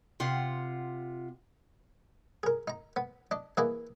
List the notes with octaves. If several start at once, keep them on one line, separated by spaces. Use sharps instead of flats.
C3 F4 F#5
G#4 A#4
D#4 A#5
B3
D4 D#5
E3 A#3 E4 G#4 D#5